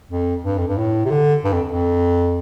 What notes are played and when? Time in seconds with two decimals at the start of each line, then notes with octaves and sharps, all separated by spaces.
0.11 F2
0.44 G2
0.59 F2
0.68 G2
0.78 A2
1.06 C3
1.11 D3
1.45 G2
1.53 F2
1.69 F2